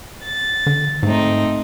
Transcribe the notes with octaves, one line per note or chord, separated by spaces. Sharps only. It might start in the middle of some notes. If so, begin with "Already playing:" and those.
A6
D3
G#2 A3 C4 D#4